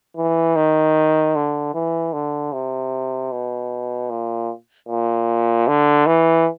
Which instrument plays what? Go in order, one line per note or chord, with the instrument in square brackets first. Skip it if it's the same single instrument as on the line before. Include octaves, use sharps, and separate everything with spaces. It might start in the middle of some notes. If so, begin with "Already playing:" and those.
[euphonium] E3
D#3
D3
E3
D3
C3
B2
A#2
A#2
D3
E3